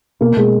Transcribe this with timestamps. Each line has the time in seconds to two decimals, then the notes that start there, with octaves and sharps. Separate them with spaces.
0.21 B2 A#3
0.37 B2 G#3